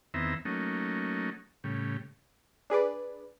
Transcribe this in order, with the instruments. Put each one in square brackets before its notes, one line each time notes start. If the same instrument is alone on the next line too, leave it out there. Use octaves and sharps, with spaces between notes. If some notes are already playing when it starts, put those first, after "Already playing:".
[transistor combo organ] E2 D#3 B3 C4 E5 A#5
F#3 A3 A#3 C#4 D#4
A2 C#3 G3
[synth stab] D4 G#4 B4 D5